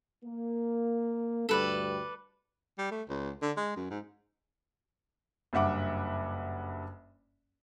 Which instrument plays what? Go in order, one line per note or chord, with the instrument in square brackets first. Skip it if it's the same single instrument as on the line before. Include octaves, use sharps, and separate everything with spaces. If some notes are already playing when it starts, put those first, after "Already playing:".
[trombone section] A#3
[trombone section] D2 G2 G3 [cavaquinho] A4 B4 D5
[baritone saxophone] G3
A3
C#2
D3
G#3
F#2
G#2
[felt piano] F#1 G2 E5 F#5 D6